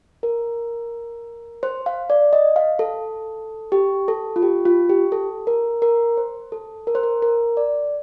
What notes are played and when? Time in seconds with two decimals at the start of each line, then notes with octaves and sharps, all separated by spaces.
0.23 A#4
1.63 C5
1.86 F5
2.10 D5
2.33 D#5
2.56 F5
2.79 A4
3.72 G4
4.08 A4
4.36 F4
4.42 G4
4.65 F4
4.89 G4
5.12 A4
5.47 A#4
5.82 A#4
6.17 C5
6.52 A4
6.87 A#4
6.95 C5
7.03 A#4
7.22 A#4
7.57 D5